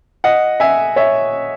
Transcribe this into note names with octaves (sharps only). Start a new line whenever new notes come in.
D#5 F#5
E5 G#5
C#5 E5